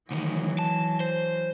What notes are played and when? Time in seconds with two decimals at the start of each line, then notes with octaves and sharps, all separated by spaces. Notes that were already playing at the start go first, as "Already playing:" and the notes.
0.11 D2 D#3 E3 F#3
0.59 A5
1.00 C5